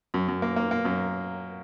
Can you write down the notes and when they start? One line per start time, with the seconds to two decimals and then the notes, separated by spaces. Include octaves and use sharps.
0.14 F#2
0.28 F#2
0.42 A#3
0.56 A#3
0.71 A#3
0.85 F#2